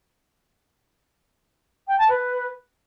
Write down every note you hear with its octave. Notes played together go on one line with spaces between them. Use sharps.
G5
A5
B4